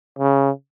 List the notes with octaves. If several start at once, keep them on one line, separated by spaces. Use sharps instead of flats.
C#3